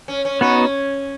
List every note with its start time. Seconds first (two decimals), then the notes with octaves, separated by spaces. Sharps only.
0.08 C#4
0.25 C#4
0.41 B3 C#4 D#4 F#4 B4